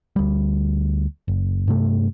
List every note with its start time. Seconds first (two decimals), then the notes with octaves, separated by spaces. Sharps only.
0.16 D2 G3
1.28 F#1
1.68 G2 C3 A3